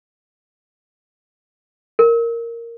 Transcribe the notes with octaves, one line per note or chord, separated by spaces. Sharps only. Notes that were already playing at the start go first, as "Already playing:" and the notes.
A#4